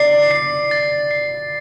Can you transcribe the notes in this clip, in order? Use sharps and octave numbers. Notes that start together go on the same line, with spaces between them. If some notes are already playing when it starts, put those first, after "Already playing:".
Already playing: D5 C7
C7
A6
C7